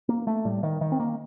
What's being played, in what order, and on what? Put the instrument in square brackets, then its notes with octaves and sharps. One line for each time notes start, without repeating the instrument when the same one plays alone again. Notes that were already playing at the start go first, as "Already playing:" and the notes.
[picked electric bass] A#3
A3
A2 G3
D#3
D#3
C4
A#3